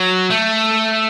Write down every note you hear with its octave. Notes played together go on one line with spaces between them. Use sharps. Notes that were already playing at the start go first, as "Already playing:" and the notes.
Already playing: F#3
A3